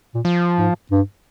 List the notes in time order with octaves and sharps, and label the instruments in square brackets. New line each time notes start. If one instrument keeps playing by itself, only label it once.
[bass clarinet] A#2
[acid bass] F3
[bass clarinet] G#2
G2